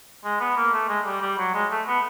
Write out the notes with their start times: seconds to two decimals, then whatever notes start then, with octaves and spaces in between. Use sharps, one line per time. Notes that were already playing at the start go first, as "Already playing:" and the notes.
0.24 G#3
0.40 B3
0.57 A#3
0.73 A3
0.89 G#3
1.06 G3
1.22 G3
1.38 F#3
1.54 G#3
1.71 A3
1.87 B3